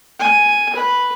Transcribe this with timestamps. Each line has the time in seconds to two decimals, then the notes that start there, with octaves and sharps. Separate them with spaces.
0.19 G#5
0.75 B4